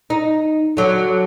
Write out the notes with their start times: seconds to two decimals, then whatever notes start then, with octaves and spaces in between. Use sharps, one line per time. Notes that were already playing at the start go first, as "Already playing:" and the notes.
0.10 D#4
0.77 D3 F#3